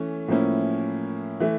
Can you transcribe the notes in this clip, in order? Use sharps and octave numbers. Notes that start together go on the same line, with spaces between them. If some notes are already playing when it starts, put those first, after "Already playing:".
Already playing: E3 A3 C#4
A2 F3 A#3 C#4 E4
E3 A3